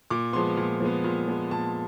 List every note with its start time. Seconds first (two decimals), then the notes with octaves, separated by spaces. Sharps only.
0.10 A#2 D6
0.33 F3 G#3 B3 C6
0.57 A#2
0.80 F3 G#3 B3
1.04 A#2
1.27 F3 G#3 B3
1.51 A#2 A5